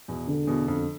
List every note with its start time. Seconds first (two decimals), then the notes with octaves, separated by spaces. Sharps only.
0.08 E2 B2
0.27 E1 D3
0.47 E2 B2
0.68 F2